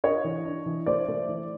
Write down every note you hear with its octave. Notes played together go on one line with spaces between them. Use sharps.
D4 C#5 D#5
E3
D4
E3
A3 C5 D5
A3
E3